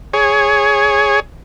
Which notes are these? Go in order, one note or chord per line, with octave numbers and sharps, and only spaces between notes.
G#4 C#5